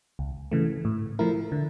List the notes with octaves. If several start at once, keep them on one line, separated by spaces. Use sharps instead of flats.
C#2
C#3 E3 A3
A2
F3 A3 E4 A#4
D3